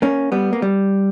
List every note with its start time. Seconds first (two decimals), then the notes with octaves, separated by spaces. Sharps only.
0.02 A#3 C#4
0.32 G3 B3
0.53 A#3
0.62 G3